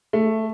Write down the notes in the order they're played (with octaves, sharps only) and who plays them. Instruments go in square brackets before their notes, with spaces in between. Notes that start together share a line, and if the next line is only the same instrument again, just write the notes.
[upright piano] A3